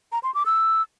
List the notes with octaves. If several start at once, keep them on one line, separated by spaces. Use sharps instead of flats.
A#5
C6
D6
E6